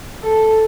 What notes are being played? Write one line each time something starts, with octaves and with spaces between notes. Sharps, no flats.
A4